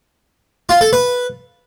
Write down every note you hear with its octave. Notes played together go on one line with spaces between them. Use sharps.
F4
A4
B4